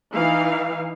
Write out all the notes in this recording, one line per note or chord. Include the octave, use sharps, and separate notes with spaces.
E3 D#4 F5